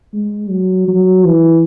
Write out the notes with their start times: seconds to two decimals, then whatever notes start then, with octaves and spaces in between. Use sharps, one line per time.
0.13 G#3
0.50 F#3
0.88 F#3
1.24 E3